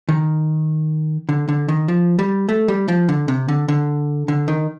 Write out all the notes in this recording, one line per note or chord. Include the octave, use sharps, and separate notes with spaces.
D#3
D3
D3
D#3
F3
G3
A3
G3
F3
D3
C3
D3
D3
D3
D#3